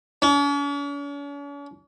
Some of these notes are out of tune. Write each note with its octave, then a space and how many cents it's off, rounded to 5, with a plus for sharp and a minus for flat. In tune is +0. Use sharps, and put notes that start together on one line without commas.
C#4 +45